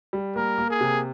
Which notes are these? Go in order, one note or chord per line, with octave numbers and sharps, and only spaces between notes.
G3
A#3 A#4
A#3
G#4
C3